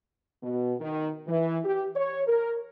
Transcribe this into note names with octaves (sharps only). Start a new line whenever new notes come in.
B2
D#3
E3
G4
C#5
A#4